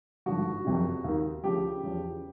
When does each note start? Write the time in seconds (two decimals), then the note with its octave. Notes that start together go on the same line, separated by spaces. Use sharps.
0.26 G#1 G2 D3 F3 F#4
0.65 F#1 F2 C3
1.04 D#2 D#3
1.43 D2 C#3 F3 G4
1.83 E2 C#3 F3